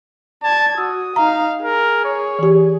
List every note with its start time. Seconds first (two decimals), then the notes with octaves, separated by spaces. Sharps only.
0.43 D5 A5 G#6
0.78 F#4 D#6 E6
1.16 D#4 F5 A#5
1.63 G#4 A#4
2.05 C#5
2.39 E3 G4